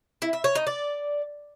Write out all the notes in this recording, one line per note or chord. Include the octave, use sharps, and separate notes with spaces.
E4
E5
C#5
D#4
D5